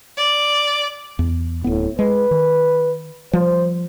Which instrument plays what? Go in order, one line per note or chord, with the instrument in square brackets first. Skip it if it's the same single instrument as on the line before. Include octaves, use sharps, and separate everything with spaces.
[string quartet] D5
[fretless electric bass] E2
[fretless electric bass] D1 B3 [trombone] A2
[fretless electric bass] G#3 [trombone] B4
[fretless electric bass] D#3
[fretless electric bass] F3 G3 [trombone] C5